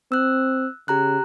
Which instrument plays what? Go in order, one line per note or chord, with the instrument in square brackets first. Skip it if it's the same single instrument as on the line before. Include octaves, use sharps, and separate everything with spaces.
[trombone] C4 [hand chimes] E6 F#6
[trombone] C#3 [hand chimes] G4 A#5 F#6